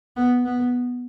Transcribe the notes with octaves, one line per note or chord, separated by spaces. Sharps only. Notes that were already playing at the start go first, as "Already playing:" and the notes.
B3
B3